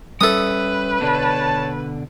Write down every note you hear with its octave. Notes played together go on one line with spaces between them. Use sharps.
G3 C#4 A4 B4 E5 D#6
B2 D3 C#5 A5